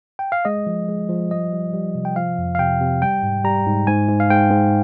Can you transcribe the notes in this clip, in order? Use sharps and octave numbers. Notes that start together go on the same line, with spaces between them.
G5
F5
G#3 D#5
F3
G#3
F3
G3 D#5
G3
G3
C3
G5
F3 F5
F2
F5
C3 G5
C3
G3 G5
G#2
G3 A#5
G#2
G#2 G#5
G#2
F5
G#2 G5
G#2